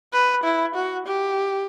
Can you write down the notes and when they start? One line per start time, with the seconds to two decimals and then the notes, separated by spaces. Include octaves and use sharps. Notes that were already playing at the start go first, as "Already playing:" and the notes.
0.13 B4
0.44 E4
0.75 F#4
1.06 G4